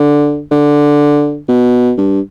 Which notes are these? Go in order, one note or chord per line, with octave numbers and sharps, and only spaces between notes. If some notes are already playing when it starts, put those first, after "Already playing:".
Already playing: D3
D3
B2
G2